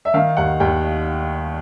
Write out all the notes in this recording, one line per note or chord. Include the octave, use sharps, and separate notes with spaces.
E5
D#3 F5
D#2 F#5
D#2 G5